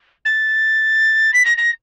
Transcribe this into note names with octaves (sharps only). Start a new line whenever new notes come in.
A6
B6
A#6
A#6